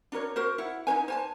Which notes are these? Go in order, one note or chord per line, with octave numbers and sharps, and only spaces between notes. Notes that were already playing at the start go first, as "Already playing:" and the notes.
D4 F#4 A#4 C#5
F#4 A#4 C5
E4 F#5
D#4 E4 C5 G#5
C5 G#5 A5